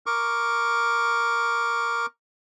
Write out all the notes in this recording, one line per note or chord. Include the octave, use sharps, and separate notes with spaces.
A#4 C#6 D6